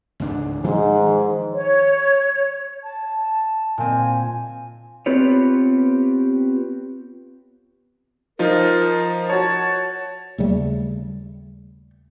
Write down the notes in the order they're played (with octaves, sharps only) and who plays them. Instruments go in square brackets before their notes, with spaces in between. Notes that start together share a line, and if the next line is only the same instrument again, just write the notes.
[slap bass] C#2 G#2 D4
[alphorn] G#2 [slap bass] D#3 F3
[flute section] C#5
[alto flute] A5
[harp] A#2 C4 [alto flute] G#5
[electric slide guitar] B3 C4 F4 G4 B4 C#5
[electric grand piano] F3 D#4 F4 [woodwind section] A#4
[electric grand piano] F#4 C#5 [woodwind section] A5
[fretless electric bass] D#2 C#3 G3 A3